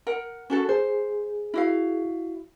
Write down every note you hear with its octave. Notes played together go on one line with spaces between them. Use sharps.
A#4 F#5
C#4 F#4 A4
G#4 C5
E4 F#4 F5